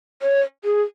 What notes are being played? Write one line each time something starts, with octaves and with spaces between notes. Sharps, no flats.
C#5
G#4